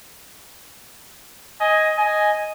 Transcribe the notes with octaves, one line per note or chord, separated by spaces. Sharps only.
D#5 G#5
D#5 G#5